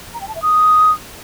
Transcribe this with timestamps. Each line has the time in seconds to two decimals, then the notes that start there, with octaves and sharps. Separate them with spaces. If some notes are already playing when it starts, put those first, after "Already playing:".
0.14 A#5
0.21 G5
0.28 A5
0.35 E5
0.42 D#6